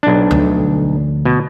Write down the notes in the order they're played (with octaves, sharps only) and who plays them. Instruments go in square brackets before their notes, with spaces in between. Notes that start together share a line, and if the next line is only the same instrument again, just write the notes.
[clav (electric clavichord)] B1 D4
[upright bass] D2 F3
[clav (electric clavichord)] B2